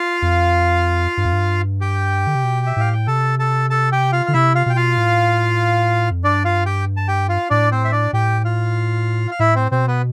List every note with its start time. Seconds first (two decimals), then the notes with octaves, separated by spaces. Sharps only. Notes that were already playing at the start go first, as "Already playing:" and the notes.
Already playing: F4 F5
0.22 F2
1.17 G2
1.25 F2
1.33 G2
1.81 G4 G5
2.27 D3
2.35 C3
2.44 B2
2.66 E5
2.76 A2 F5
2.93 G5
3.07 C3 A4 A5
3.39 A4 A5
3.70 A4 A5
3.92 G4 G5
4.12 F4 F5
4.26 D3 F5
4.33 C3 E4 E5
4.55 F4 F5
4.66 B2 G5
4.76 F4 F5
4.97 A2
6.11 F2
6.24 G2 D4 D5
6.45 F4 F5
6.66 G4 G5
6.97 A5
7.08 G4 G5
7.29 F4 F5
7.50 A2 D4 D5
7.72 C4 C5
7.85 E5
7.92 D4 D5
8.13 A2 G4 G5
8.45 F4 F5
9.31 F5
9.39 A2 E4 E5
9.55 C4 C5
9.71 B2 C4 C5
9.87 B3 B4